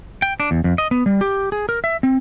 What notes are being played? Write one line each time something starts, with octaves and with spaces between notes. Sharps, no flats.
G5
D4
E2
F2
D#5
B3
G3
G4
G#4
A#4
E5
C4